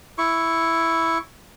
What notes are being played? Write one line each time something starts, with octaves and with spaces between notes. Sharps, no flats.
E4 C#6